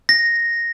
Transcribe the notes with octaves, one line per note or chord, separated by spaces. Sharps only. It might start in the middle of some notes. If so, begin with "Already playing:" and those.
A#6